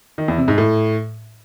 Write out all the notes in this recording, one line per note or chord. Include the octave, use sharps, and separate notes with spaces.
D#3
E2
C3
G#2
A2